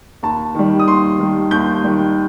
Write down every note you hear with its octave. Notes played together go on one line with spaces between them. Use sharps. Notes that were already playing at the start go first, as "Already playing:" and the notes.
D#2 A5
D#3 G3
D#6
D#2 C6
D#3 G3
D#2 G6
D#3 G3